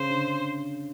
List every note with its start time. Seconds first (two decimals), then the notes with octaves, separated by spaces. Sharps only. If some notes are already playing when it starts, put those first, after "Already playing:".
Already playing: C#3 C5
0.10 D3